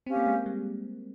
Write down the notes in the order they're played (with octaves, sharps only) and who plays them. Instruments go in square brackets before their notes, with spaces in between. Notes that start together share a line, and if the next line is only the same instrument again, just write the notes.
[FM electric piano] C4 [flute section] C#4 G4 C5 F5
[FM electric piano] A#3
G#3
G3